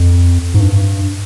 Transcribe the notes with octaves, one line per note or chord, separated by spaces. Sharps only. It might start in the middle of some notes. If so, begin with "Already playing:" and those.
Already playing: F2
G#2
G2